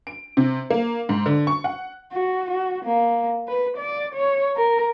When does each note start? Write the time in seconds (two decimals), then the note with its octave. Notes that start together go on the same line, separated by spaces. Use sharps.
0.07 D7
0.37 C3
0.70 A#3
1.09 G#2
1.26 D3
1.47 C#6
1.64 F#5
2.12 F#4
2.51 F#4
2.85 A#3
3.48 B4
3.77 D5
4.14 C#5
4.56 A#4